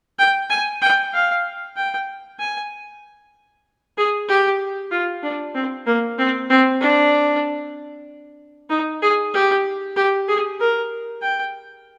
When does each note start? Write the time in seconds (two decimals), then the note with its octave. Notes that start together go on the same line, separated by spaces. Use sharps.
0.19 G5
0.50 G#5
0.81 G5
1.13 F5
1.77 G5
2.39 G#5
3.97 G#4
4.29 G4
4.91 F4
5.23 D4
5.54 C4
5.86 A#3
6.18 C4
6.50 C4
6.80 D4
8.70 D#4
9.02 G#4
9.34 G4
9.96 G4
10.28 G#4
10.60 A#4
11.22 G5